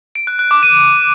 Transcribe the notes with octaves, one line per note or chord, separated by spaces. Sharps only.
D7
F#6
F#6
D6
D#7